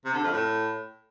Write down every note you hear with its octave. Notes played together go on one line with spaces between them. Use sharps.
C3
D3
F2
A2